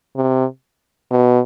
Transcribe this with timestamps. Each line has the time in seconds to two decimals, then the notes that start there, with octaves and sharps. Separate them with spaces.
0.16 C3
1.11 B2